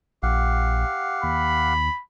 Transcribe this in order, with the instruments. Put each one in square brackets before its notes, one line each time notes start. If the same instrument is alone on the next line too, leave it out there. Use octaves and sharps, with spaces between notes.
[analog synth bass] A#1 [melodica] G4 F5 F#5
[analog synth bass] D#2 [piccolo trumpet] B5